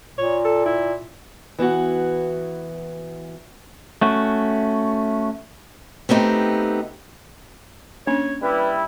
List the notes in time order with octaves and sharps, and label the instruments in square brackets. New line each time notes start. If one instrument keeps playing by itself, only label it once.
[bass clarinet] A#2 [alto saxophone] C#5
[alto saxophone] A4
E4
[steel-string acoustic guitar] E3 B3 E4 F#4
[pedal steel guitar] A3 C#4 F#4
[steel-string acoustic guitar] A3 B3 C4 D#4 G4
[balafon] A#3 C#4 D4 [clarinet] C#5
[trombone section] G3 E4 [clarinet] B4